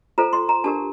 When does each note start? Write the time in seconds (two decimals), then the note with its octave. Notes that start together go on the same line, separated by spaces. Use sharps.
0.18 F4 A4 C5 A#5
0.33 C6
0.49 A#5
0.64 D4 G4 A#4 A5